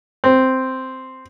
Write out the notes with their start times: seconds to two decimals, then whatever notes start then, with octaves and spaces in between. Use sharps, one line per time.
0.24 C4